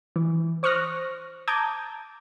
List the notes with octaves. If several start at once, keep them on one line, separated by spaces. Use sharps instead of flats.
E3
C5 C#6 D#6 F6 F#6 A#6
A5 A#5 D6 D#6 G6 G#6